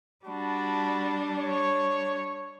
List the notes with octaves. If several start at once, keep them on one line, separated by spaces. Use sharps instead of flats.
G3 D4 F#4 A5 B5
C#5